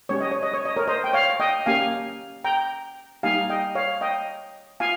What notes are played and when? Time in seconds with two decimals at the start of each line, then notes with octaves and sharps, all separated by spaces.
0.09 G#3 C#4 G4 C#5
0.20 D#5
0.32 C#5
0.43 D#5
0.53 C#5
0.65 D#5
0.77 A#4 C#5
0.88 C5 D#5
1.04 G5
1.13 C#5 F5
1.40 D#5 G5
1.66 A#3 C#4 G4 F5 G#5
2.45 G5 A#5
3.23 G3 A#3 D#4 G4 F5 G#5
3.49 D#5 G5
3.75 C#5 F5
4.01 D#5 G5
4.80 F4 F5 G#5